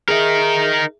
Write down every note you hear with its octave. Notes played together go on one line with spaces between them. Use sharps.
D#4 G#4 A#4 E5